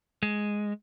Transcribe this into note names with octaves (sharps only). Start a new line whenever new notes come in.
G#3